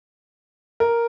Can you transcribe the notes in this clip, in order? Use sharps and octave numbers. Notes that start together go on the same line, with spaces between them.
A#4